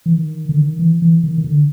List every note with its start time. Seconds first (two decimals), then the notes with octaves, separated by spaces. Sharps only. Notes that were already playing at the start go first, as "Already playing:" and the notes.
0.06 E3
0.15 D#3
0.49 D3
0.58 D#3
0.79 E3
1.02 E3
1.24 D#3
1.38 D#3
1.44 D3